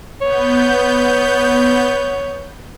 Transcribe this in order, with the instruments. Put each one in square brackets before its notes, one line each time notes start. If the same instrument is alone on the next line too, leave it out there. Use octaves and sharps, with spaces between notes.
[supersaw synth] B3 G6 [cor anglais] C#5